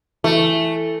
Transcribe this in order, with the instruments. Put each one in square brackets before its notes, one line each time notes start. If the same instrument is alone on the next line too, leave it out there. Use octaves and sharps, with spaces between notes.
[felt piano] E3 [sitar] A3